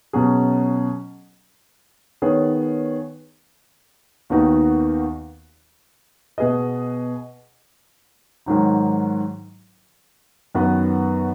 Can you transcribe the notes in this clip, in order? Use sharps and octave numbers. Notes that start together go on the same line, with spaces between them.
B2 F#3 C#4 G#4
D#3 B3 G#4 C#5
D#2 D#3 B3 D#4 F#4
B2 B3 G#4 B4 D#5
G#2 D#3 F#3 D#4
F#2 D#3 B3 F#4 B4